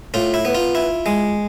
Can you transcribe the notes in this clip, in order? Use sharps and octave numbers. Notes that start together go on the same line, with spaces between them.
A2 F4
E4
B3
F4
E4
G#3